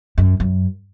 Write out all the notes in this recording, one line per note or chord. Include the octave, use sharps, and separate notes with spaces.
F#2
F#2